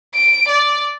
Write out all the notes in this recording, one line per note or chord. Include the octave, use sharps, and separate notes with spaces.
D7
D5